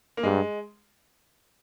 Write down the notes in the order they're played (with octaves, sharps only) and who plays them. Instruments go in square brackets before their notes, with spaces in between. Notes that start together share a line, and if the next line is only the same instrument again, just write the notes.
[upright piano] A#3
[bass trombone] G2 [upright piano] G#3